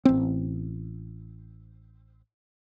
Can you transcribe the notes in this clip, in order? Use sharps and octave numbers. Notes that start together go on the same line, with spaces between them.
A1 C4